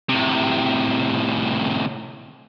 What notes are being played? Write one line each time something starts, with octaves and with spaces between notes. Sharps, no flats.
A2 C3